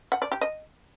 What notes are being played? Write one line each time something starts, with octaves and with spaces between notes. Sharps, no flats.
F#5
D5
G4
D#5